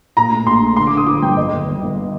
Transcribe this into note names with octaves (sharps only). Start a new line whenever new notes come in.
A#2 A#5
A3
A#1 C6
A3
D3 C6
D6
D3
D#6
F3 D6
G2 G5
G1 D#5
G1
G1
G1